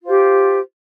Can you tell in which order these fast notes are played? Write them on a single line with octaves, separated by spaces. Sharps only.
F4 C5 G4